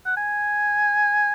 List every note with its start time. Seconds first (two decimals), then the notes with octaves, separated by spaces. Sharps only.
0.05 F#5
0.17 G#5